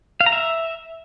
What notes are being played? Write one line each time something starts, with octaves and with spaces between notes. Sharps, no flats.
F5
A#5
E5